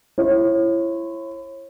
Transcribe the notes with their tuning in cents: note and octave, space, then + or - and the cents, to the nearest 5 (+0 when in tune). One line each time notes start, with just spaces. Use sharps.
E4 +30 C#5 -35